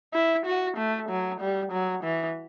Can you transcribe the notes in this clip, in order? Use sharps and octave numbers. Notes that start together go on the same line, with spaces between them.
E4
F#4
A3
F#3
G3
F#3
E3